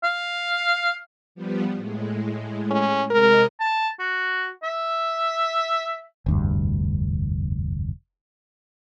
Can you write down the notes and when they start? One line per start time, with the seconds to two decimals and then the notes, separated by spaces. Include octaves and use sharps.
0.03 F5
1.35 F3 G3 B3
1.76 A2 G#3
2.71 C#4
3.10 C3 G#3 A#4 D#5
3.60 A5
4.00 F#4
4.63 E5
6.26 F1 D2 G2